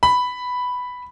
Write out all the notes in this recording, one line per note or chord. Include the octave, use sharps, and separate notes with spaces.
B5